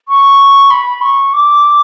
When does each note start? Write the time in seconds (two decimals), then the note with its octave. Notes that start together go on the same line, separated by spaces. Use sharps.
0.09 C#6
0.70 B5
1.01 C#6
1.33 D6